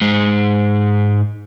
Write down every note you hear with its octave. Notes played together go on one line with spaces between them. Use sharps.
G#2 G#3